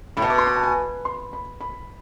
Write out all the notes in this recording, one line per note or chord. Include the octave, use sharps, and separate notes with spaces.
A2 B5
B2 A5
D6
C6
B5
A5
G#5
C6
B5
B5